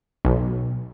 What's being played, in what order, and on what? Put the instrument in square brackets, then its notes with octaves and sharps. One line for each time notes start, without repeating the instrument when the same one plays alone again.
[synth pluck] B1